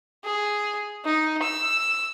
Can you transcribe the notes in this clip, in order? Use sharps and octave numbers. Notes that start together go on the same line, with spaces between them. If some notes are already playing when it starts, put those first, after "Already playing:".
G#4
D#4
E6